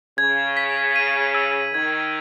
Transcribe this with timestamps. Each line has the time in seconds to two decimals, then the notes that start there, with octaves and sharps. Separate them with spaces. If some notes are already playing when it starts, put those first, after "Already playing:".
0.18 C#3 G#6
0.57 B6
0.96 D#7
1.35 E6
1.74 D#3 G#6